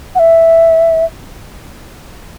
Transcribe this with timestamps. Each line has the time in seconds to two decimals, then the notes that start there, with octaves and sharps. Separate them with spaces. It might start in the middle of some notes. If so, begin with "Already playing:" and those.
0.15 F#5
0.19 E5